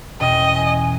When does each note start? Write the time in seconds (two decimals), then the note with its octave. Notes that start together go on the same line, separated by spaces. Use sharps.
0.20 E2 B2 C#4 D#5 G5
0.54 G#5